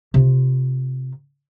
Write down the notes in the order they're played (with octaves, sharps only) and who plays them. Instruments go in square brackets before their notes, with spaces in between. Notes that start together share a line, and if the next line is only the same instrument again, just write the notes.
[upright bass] C3 F4